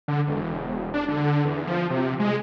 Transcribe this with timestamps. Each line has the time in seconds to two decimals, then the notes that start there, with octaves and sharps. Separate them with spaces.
0.08 D3
0.28 E1
0.94 D4
1.09 D3
1.45 E2
1.67 F3
1.90 C3
2.20 G#3